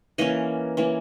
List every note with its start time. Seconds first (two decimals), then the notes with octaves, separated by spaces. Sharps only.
0.18 E3 A#3 C#4 D#5
0.77 E3 A#3 C#4